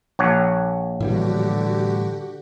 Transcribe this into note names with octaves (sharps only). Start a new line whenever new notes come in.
A#1 C#5 F#5
A2 D3 E3 G3 F#4 G4